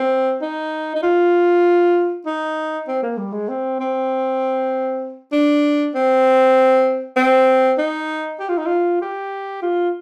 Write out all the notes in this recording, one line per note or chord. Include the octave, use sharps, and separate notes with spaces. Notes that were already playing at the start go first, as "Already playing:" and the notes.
Already playing: C4
D#4
D#4
F4
D#4
C4
A#3
G3
G#3
C4
C4
D4
C4
C4
D#4
G4
F4
D#4
F4
G4
F4